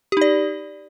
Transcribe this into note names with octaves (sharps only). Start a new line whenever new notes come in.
D#4 G4 D5